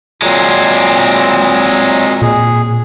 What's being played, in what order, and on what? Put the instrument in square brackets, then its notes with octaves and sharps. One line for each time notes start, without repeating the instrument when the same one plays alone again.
[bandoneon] A#2 F#3 [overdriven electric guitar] G#3 C4
[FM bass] A#2 [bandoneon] G#4